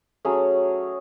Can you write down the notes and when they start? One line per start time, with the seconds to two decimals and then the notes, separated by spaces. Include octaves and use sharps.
0.25 F#3 A3 C#4 G#4